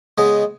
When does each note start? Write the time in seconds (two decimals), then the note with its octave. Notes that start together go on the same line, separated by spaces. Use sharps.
0.18 C#3 G#3 B3 D#5